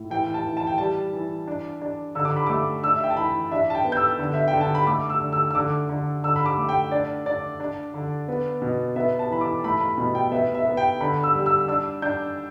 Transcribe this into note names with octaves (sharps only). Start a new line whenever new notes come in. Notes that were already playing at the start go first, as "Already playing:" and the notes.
Already playing: A2
E3 G5
A5
E3
A5
G5
G3 A5
E3
D4
D4
D3 E6
D6
B5
A3 D6
D4 E6
E5
G5
A5
E3 B5
D4 E5
A5
G5
B3
G6
E6
D3
E5
G5
D3
A5
B5
A3 D6
E6
D3
E6
E6
D3 D6
D3
D3 E6
B5
D6
A3
G5
D4 D5
D4 D5
D4
D3
B3
B2
B3 E5
A5
E3 B5
D6
A3 B5
B5
B2 B5
G5
B3 E5
E5
B3
G5
D3 B5
E6
G3
E6
D4 E6
D4 G6